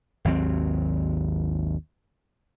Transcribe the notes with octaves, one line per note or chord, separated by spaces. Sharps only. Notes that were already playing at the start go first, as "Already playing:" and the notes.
G#1 D#2 F#3 C4